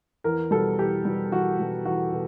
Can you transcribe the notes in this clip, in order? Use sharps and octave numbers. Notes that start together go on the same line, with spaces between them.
E2 A#4
B2 G3 A4
E2 G4
B2 G3
E2 F#4
B2 G3
E2 F#4
B2